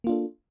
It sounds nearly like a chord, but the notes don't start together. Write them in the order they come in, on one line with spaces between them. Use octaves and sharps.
A#3 F4 D4 A4